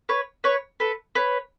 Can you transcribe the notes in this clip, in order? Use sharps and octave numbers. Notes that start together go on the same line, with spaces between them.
B4 C#5
B4 C#5
A4 B4
B4 C#5